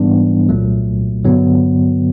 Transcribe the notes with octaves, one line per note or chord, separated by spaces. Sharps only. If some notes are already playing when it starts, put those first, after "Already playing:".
Already playing: G#2 E3 G3 B3 D4
C2 A#2 F#3 A3
G2 D3 F#3 B3